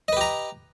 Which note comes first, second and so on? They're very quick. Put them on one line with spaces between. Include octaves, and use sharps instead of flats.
D#5 B4 G4 A#5